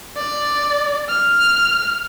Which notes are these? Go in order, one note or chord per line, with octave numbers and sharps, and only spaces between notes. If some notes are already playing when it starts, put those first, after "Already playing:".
D5
F6